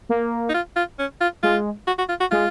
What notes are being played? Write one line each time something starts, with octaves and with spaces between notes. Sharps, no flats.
A#3
D#4
F4
F4
C#4
F4
G#3 F4
F#4
F#4
F4
F#4
G#3 F4